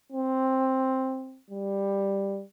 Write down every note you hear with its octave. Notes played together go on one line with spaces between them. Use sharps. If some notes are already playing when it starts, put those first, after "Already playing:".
C4
G3